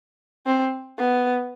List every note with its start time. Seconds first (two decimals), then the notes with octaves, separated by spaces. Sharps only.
0.47 C4
0.98 B3